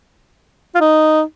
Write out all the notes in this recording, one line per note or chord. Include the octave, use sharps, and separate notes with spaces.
F4
D#4